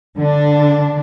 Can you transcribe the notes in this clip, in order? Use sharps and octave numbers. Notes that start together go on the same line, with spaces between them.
D3 D4